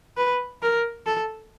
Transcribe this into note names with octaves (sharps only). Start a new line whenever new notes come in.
B4
A#4
A4